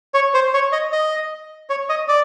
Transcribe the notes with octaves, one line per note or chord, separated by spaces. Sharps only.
C#5
C5
C#5
D#5
D#5
C#5
D#5
D5